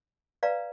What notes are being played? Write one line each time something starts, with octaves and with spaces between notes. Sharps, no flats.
B4 D5 F5 A#5